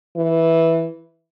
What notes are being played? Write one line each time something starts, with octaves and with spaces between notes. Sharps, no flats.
E3